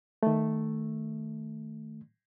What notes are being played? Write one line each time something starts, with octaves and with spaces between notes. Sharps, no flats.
D#3 A3